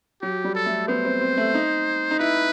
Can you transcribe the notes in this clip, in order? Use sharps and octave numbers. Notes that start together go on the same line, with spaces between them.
F#3 G4
G3
A4
A3
B3 C5
C4
C4
A3
D#4
D#4
E4 B4